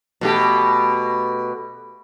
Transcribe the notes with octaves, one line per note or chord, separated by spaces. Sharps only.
B2 A3 G4